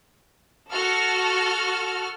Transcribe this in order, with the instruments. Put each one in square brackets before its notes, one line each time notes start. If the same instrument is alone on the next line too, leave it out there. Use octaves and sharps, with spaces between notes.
[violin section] F#4 A4 F6